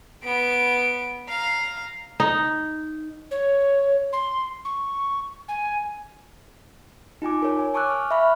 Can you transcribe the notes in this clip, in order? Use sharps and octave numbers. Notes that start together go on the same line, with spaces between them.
B3 D7
F5 A#5
D#4
C#5
C6
C#6
G#5
D#4 F4 G#5 D6
A#4 C#5
G#5
G#5 A5 C#6 D6 E6 F#6
F6
E5 F5 B5 C#6 F6 F#6